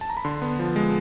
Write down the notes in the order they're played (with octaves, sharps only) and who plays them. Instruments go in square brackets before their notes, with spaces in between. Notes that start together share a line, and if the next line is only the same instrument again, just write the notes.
[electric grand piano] A5
A#5
B5
D3 C6
B3
F3
G#3